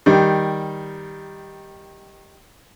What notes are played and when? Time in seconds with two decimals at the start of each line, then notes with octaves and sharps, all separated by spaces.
0.06 D#3 G3